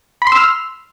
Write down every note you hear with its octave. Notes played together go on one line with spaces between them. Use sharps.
B5
C6
E6
F6